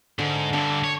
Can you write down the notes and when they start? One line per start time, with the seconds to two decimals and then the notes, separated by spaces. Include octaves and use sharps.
0.19 G#2 D3
0.53 G2 D3 D4
0.84 C#5